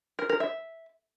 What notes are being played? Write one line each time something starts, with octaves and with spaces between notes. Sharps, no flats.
A#4
A#4
E5